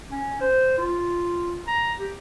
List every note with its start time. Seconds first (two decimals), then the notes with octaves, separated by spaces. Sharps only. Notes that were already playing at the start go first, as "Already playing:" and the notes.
0.11 C#4
0.41 C5
0.78 F4
1.67 A#5
1.98 G4